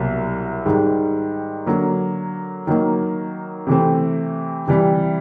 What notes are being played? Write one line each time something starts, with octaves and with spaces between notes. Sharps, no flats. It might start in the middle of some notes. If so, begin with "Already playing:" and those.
Already playing: C2 B2 F#3 A#3
G#2 D#3 G3
D3 F#3 A#3
D#3 F#3 A#3
C3 E3 A3 C4
C3 E3 G3